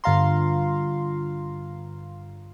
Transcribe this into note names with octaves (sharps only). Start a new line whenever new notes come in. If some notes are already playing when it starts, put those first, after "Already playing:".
G2 D3 F4 F5 A#5 C6